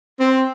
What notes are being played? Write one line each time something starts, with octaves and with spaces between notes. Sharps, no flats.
C4